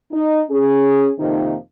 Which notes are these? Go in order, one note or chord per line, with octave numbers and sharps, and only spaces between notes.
D#4
C#4 G#4
F2 C3 D#3 F3 A#3 D#4